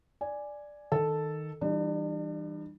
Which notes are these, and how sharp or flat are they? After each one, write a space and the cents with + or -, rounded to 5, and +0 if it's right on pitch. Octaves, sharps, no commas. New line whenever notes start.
D5 +0 G#5 +0
D#3 +0 A4 +0
E3 -5 G3 +0 D4 +40